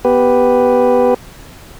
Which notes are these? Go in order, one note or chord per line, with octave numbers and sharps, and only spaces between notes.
B3 G4 B4